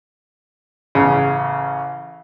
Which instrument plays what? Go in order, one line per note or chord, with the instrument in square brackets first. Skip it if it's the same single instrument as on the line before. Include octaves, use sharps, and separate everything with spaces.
[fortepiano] A1 C#3